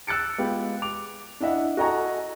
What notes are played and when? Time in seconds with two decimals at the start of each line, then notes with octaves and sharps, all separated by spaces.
0.07 E6 F#6 A6 C#7 D7
0.38 G#3 B3 F4 G4
0.82 D6 F7
1.40 D4 E4 D#5 E5 F#5
1.77 F#4 A4 D#5 G#5 A#5 C#6